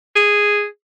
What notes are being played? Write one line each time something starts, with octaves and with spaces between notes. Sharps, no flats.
G#4